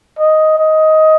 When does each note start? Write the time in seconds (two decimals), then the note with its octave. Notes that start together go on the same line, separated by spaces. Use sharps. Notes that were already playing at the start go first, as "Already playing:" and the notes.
0.19 D#5
0.58 D#5